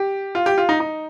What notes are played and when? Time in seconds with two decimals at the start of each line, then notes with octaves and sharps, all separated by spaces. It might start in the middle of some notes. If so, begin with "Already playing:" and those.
Already playing: G4
0.35 F4
0.46 G4
0.58 F4
0.69 D#4
0.80 D#4